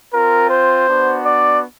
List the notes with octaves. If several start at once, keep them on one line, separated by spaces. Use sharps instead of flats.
C4 F4 A#4
C5
B3 D4 F#4
D5